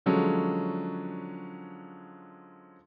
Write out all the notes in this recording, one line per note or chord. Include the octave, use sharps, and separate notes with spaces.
D3 F3 F#3 G#3 C#4